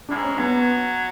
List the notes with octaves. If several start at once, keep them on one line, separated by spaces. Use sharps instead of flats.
A2 D4
G#2
C#4
F#3 B3